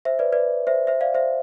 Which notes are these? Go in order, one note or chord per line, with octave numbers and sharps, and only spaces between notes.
C5 E5
B4 D5
B4 D5
C5 E5
C5 E5
D5 F5
C5 E5